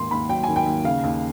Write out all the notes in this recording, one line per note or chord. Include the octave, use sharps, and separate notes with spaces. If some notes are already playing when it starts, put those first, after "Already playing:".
Already playing: D#2 G#2 D#3 C6
D#2 B5
F#3 G5
D#3 G#5
G5
D#2
C#3 F5
D#2